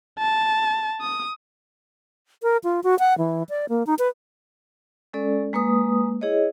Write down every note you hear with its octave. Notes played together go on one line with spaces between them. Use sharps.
A5
D#6
A#4
F4
F#4
F#5
E3
D5
A#3
D#4
B4
G#3 C#4 A4 D5
G#3 A#3 B4 D#6
E4 G#4 C#5 D#5